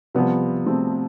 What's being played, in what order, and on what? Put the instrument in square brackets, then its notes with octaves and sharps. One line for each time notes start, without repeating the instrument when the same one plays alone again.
[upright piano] C3 F3 G3 B3
A3 C4